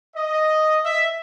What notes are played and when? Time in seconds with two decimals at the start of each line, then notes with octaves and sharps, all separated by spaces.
0.16 D#5
0.85 E5